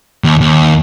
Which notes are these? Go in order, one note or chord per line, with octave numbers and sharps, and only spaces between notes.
D#2
D#2